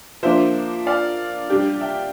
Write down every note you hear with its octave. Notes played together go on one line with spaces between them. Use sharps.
F3 A#3 D4 C5 E5
D5 F5
G3 D4 G4
E5 G5